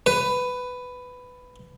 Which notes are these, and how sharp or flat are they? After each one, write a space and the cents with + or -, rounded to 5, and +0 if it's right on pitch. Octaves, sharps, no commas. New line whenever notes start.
B4 +10